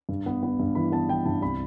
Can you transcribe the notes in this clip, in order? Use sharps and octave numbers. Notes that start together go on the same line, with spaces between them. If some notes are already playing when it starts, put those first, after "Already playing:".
G2
B3
B3
G2
E3 B5
B3 A5
E3 G5
G2 A5
C2 B5